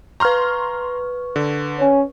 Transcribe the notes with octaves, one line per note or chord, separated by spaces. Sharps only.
B4 A#5 C6 C#6 F6
D3
C#4